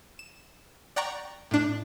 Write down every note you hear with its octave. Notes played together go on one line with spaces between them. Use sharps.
E7
D5 F#5 G5 A#5 C#6
A2 D4